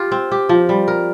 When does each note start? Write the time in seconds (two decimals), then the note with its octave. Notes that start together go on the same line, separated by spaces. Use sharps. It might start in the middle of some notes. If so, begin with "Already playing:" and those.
Already playing: F4 G4
0.12 C4
0.31 G4
0.49 F3
0.69 G3
0.88 A#4